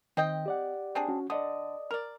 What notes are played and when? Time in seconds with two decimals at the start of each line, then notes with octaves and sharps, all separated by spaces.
0.17 D#3 C4 D#5 G5
0.46 G4 D5 F#5
0.95 C4 D4 G#4
1.08 C#4 F#4
1.30 D3 D5 D#5 D#6
1.91 A#4 D5